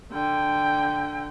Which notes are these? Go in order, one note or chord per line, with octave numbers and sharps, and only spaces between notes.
D3 G5